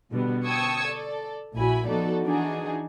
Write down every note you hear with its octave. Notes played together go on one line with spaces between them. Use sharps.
B2 D3 G3 B3
G5 A5 C#6 D#6 E6 G#6
A4 D5
A#1 A#2 E4 F#4 G#5 B5
F3 B3 D#4 F#4 A4 D5
E3 D4 D#4 F#4 G#4